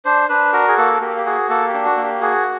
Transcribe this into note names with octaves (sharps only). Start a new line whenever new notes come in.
D4 C5
D4 B4
F#4 A#4
G#4
A#3 A4
A#3 G4
G4
F#4 G#4
A#3 A4
G4
D4
F#4
A#3
G4
F#4 G#4